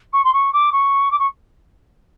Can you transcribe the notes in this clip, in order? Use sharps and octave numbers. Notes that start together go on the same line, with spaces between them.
C#6
C6
C#6
D6
C#6
D6
C#6